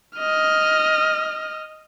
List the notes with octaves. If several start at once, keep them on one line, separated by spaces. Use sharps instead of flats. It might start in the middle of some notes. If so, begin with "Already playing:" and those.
D#5 F6